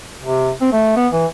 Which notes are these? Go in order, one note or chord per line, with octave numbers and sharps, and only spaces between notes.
C3
C4
A3
B3
E3